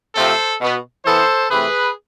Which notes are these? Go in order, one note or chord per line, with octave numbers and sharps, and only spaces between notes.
C3 F3 A3 C4 A4 C5
B2 B3
E3 B3 A4 C5
C3 E3 A3 C4 G#4 B4